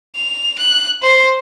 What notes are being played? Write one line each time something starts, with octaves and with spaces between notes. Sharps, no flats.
F7
F#6
C5